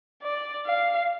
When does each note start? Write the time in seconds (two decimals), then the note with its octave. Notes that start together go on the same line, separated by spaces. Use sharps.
0.22 D5
0.66 F5